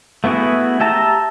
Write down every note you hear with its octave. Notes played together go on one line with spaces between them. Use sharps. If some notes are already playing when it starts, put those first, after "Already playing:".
A3 B3 E4 F#4 G#4
G4 E5 A5 A#5